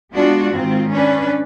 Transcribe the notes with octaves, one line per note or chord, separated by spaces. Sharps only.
G#3 B3 D4 F4 F#4
G#2 D#3 C4 F4
C#4 D4 B4